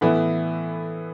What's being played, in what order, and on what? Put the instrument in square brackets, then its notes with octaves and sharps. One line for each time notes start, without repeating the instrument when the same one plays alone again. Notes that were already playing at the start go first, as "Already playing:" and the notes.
[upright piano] A2 E3 B3 E4